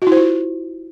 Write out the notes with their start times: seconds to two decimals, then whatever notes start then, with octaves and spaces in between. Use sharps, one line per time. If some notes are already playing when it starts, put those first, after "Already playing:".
0.02 F#4
0.07 E4
0.12 C5
0.17 F4